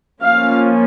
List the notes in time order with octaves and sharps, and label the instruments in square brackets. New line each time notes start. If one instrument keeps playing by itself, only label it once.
[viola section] F3 A#3 C#4 F5